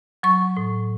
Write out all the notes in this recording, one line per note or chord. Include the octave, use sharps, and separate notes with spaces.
F#3 C#6
A2